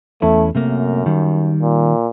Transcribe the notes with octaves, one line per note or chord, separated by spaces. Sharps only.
E2 A3 C#4 E4
F#2 C3 A3 A#3
D#3 G3
A#2